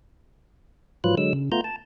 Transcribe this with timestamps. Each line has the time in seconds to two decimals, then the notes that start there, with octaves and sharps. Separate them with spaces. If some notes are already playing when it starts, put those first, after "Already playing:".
1.04 G#2 F3 F#3 F4 B4 F#6
1.17 D3 F#3 G#3 E6
1.33 C#3
1.52 A3 B3 F4 A#5 G6
1.64 A5